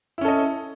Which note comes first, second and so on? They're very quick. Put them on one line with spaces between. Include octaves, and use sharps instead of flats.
E4 C#4 A4 D#5